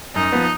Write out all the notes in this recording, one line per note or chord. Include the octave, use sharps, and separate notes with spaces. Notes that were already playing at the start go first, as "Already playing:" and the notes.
F#2 D#4
F3 B3